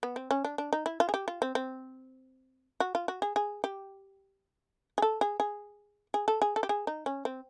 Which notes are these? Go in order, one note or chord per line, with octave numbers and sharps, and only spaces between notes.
B3
C4
C#4
D4
D4
D#4
E4
F4
G#4
G4
F4
C4
C4
F#4
F4
F#4
G#4
G#4
G4
G#4
A4
G#4
G#4
G#4
A4
G#4
A4
G4
G#4
D#4
C#4
C4